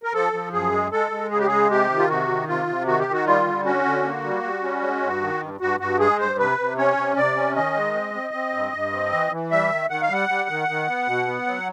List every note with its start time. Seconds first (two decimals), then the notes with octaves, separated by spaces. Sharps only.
0.03 A#4
0.14 F3 A4
0.33 F3
0.53 F#2 G#4
0.72 G#3
0.92 G#3 A4
1.11 G#3
1.31 C#3 G#4
1.39 G4
1.47 G#3 G#4
1.70 C3 G4
1.90 D#3
1.98 F4
2.09 C3 F#4
2.29 D#3
2.48 C3 F4
2.67 C3
2.87 D#3 F#4
3.00 G4
3.07 D#3
3.13 F#4
3.26 G3 F4
3.45 D3
3.65 C#4 F#4
3.85 D3
4.04 A#3
4.24 G3
4.43 G3
4.63 C#4
4.82 G#3
5.02 G2
5.22 D#3
5.41 G2
5.60 G2 F#4
5.80 G2 F#4
5.99 G#3 G#4
6.19 G2 C5
6.39 C3 B4
6.59 C3
6.78 C#4 C#5
6.97 C3
7.17 C3 D5
7.36 C#4
7.56 D#3 D#5
7.75 G#3
7.95 C4
8.14 C4
8.34 C4
8.54 G2
8.73 G2
8.92 C4
9.12 E3
9.32 E3
9.51 G3 E5
9.70 D#3
9.90 D#3 F#5
10.02 F5
10.09 G3 F#5
10.29 G3
10.49 D#3
10.68 D#3
10.88 B3
11.07 B2
11.27 B3
11.46 F#3